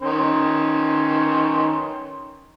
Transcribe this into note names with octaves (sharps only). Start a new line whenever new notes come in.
D#3 C#4 C6